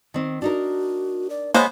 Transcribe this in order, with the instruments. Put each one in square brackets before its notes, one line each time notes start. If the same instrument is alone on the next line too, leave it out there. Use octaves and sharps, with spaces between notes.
[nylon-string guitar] D#3 C4
[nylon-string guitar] D4 D#4 A#4 [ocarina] F#4
[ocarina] D5
[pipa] G#3 B3 [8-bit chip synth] A#3 C5 [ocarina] C#5